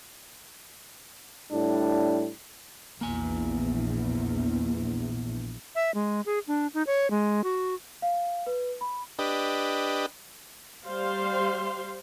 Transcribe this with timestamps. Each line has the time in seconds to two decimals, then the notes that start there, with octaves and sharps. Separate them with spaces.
1.51 A2 G3 D4
3.01 A#1 E2 A#3 G#5
5.75 E5
5.95 G#3
6.26 G#4
6.47 D4
6.74 D#4
6.87 C#5
7.11 G#3
7.44 F#4
8.02 F5
8.46 B4
8.81 B5
9.19 D4 G4 B4 D#5
10.86 G3 C5 F5 C6